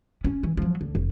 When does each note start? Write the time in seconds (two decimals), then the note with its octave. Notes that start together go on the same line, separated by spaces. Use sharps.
0.24 C#4
0.43 E3
0.57 F3 F#3
0.81 D2
0.95 F1